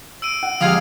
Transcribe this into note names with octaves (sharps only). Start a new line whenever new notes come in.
E6 D7 D#7
F#5
F2 G#3 G4 F5 D#6 G#6 D#7